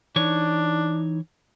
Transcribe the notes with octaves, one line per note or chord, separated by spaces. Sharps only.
E3 D4 D#4 C#5